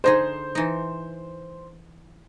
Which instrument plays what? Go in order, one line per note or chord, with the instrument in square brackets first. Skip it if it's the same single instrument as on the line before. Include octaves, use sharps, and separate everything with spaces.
[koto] D3 D#4 G#4 [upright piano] C5
[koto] E3 D#4